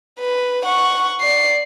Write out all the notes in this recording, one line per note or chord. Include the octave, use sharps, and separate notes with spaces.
B4
F#5 C#6
D5 C7